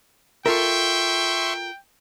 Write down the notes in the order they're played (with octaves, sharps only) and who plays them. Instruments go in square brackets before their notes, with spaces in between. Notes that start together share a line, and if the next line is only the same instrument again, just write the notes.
[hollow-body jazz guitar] F4 A4 A#4 [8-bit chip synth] E5 C6 C#6 [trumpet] G5